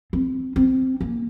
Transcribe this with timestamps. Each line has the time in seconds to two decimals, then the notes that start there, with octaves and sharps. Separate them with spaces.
0.13 C4
0.56 C4
1.01 A#3